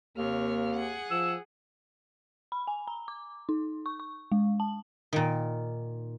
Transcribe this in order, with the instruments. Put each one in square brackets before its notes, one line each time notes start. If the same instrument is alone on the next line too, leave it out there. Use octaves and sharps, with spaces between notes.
[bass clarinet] D#2 [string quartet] C3 C#5 F6 [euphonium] A#3
[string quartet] G#4 F#5
[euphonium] F3 [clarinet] E6
[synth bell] B5
G#5
A#5
D6
D#4
C#6
C#6
G#3
A5
[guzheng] A#2 D#3